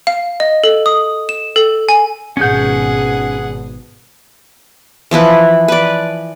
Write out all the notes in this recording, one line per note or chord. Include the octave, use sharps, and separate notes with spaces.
F5
D#5
A4
D#6
E7
A4
G#5
G#1 B2 C#4 G#4 F#5 G6
E3 F3 E4 B4
B4 D5